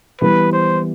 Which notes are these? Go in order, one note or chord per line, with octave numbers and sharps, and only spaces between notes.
E3 G3 B3 B4
C5